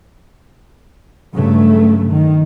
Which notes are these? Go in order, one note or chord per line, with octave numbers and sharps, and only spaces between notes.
G2 C#3 F#3 A3
D#3